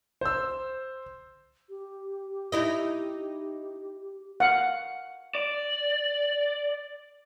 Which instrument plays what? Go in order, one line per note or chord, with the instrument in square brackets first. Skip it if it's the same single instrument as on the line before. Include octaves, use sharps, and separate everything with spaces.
[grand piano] C5 E6
[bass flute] G4
[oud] D#4 E4 D#5
[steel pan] F5 F#5
[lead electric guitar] D5